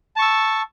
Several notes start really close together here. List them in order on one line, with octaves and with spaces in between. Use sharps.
A5 C#6 E6